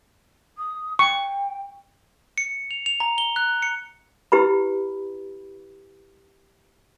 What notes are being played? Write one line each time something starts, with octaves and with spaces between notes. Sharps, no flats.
D#6
G5 C#6
C#7
F7
F7
A#5
G7
F#6
C#7
E4 G4 B4 B5